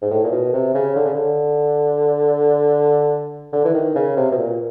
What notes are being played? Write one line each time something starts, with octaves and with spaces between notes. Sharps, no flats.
G#2
A2
A#2
B2
C3
C#3
D3
C#3
D3
D3
E3
D#3
C#3
C3
B2
A#2